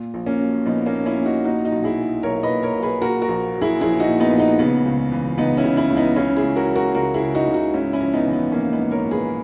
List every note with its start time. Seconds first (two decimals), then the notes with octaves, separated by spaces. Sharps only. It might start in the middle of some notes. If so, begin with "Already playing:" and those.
Already playing: A#2
0.14 A#1
0.26 A#3 C#4
0.41 F#3
0.66 A#1 B3 D#4
0.86 A#3 C#4
0.92 A#2
1.06 C#4 E4
1.19 A#1
1.25 D#4 F#4
1.44 A#2 D#4 F#4
1.64 D#4 F#4
1.72 B1
1.84 E4 G#4
1.98 F#3
2.23 B1 A#4 C#5
2.43 B4 D#5
2.49 A#2
2.63 A#4 C#5
2.75 B1
2.83 G#4 B4
3.02 A#2 F#4 A#4
3.22 F#4 A#4
3.28 A#1
3.55 F#3
3.61 E4 G#4
3.81 A#1 E4 G#4
4.00 D#4 F#4
4.08 A#2
4.20 B3 D#4
4.33 A#1
4.39 B3 D#4
4.59 C#3 B3
4.86 C#2
5.12 E3
5.38 C#2 B3 D#4
5.57 C#4 E4
5.64 C#3
5.77 C#4 E4
5.91 C#2
5.97 B3 D#4
6.16 C#3 C#4 E4
6.37 E4 G#4
6.43 C#2
6.56 F#4 A#4
6.70 F#3
6.75 F#4 A#4
6.95 C#2 F#4 A#4
7.14 E4 G#4
7.22 C#3
7.35 D#4 F#4
7.47 C#2
7.54 D#4 F#4
7.74 G#2 C#4 E4
7.93 C#4 E4
8.01 A#1
8.13 B3 D#4
8.27 E3
8.33 B3
8.52 A#1 A#3 C#4
8.72 B3 D#4
8.78 G#2
8.91 A#4 C#5
9.05 A#1
9.11 G#4 B4